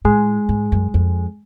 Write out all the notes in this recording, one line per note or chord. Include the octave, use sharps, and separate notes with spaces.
A2 G#3
G#2
F#2
F2